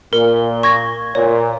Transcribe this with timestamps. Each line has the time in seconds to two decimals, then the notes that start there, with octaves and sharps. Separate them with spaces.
0.13 A#2 A#4
0.63 C#6 G#6 A#6
1.15 A#2 C#5